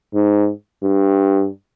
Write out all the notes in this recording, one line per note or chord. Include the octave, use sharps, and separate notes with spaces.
G#2
G2